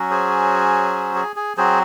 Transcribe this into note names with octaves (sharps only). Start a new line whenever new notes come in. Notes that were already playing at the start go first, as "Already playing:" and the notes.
Already playing: F#3 C#4 F#4
G#4 C5
G#4
G#4
F#3 C4 F#4 G#4 C5